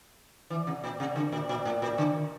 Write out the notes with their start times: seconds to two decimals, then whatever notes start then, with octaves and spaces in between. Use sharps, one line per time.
0.50 E3
0.67 C3
0.84 A#2
1.00 C3
1.16 D3
1.32 A#2
1.49 A#2
1.65 A2
1.82 A#2
1.98 D3